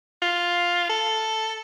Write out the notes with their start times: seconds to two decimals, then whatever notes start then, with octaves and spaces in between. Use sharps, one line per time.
0.22 F4
0.89 A4